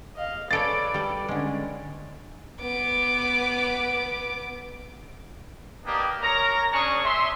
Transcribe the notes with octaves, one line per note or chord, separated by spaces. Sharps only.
D#5 F5
G#4 A4 B4 C#5 D5 A6 D7
G3 A4
D3 G#3 C#4
B3 D6
A#3 B3 D4 G4 D5 D#5
A#4 C#5 A#5
G#3 C#4 D4 G#4 C#6 D#6
E5 C6